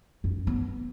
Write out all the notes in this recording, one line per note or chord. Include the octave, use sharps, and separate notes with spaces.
F#2
B3